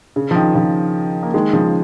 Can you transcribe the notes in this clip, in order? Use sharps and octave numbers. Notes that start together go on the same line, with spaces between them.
C#3
F3
D#3
C#3 F3
A#3
D#3 G#3
C#3 F3